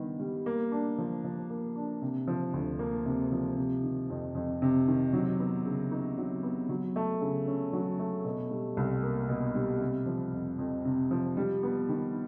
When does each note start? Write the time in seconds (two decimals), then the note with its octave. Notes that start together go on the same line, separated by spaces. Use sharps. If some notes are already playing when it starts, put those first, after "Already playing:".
Already playing: G2 D#3 B3
0.20 G3
0.46 A#3
0.72 D4
0.98 F3
1.24 F3
1.50 A#3
1.76 D4
2.02 C3
2.28 F3
2.53 D2
2.79 A#3
3.06 C3
3.32 F3
3.57 C3
3.83 D#3
4.10 F2
4.35 F2
4.62 C3
4.88 D#3
5.13 F#3
5.39 B3
5.66 C#3
5.91 D#4
6.18 F#3
6.43 B3
6.69 F#3
6.96 A3
7.21 C#3
7.47 C#4
7.73 F#3
7.99 A3
8.24 B2
8.51 G3
8.77 C2
9.03 A#3
9.29 B2
9.55 G3
9.81 C3
10.06 F3
10.33 F2
10.59 F2
10.85 C3
11.11 F3
11.37 G3
11.63 B3
11.89 D#3